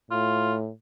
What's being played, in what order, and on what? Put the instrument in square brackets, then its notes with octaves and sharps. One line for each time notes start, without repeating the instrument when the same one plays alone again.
[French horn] A2 [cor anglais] F4